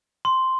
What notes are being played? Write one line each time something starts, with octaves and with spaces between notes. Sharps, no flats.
C6